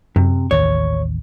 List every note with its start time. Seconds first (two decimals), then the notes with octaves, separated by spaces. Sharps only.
0.16 F#2 C3
0.51 A1 D#2 C#5